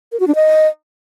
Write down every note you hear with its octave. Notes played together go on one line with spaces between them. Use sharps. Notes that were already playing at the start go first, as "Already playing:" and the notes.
A#4
F#4
D4
D#5